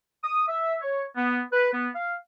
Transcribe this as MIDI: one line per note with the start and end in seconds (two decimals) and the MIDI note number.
0.24 0.44 87
0.48 0.75 76
0.82 1.05 73
1.16 1.41 59
1.53 1.69 71
1.74 1.89 59
1.95 2.14 77